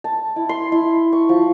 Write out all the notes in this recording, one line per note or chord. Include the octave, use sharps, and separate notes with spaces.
A5
E4
C6
E4
C#6
F3